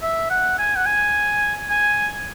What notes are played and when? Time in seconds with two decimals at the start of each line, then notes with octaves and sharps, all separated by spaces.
0.02 E5
0.30 F#5
0.58 G#5
0.76 F#5
0.86 G#5
1.70 G#5